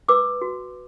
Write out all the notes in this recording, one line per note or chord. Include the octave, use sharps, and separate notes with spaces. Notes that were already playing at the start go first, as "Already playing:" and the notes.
B4 D6 E6
F#4